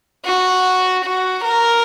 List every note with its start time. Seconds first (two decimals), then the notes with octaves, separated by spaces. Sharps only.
0.25 F#4
1.05 F#4
1.44 A#4